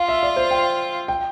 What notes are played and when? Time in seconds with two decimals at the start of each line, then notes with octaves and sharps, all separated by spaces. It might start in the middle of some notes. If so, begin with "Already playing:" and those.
Already playing: F4 F5
0.09 E5
0.23 D5
0.36 C5
0.51 G5
1.08 G5